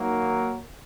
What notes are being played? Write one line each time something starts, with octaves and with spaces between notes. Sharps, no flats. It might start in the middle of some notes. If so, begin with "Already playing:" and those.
Already playing: D#2 D#3 F#3 A#3